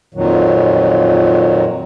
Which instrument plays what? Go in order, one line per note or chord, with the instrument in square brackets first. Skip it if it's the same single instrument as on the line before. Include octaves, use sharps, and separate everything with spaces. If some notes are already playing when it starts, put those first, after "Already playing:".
[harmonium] F2 A#2 D#3 F#3